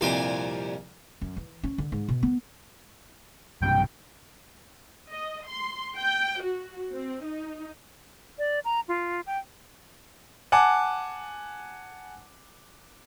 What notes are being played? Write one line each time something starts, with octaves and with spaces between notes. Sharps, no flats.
C2 F2 A#2 F4 D5 G#5
F#2
E3
C#4
D3
G#2
B2
B3
B1 G2 C3 G5
D#5
C6
G5
F#4
C4
D#4
D5
A#5
F4
G5
F#5 G#5 A5 D6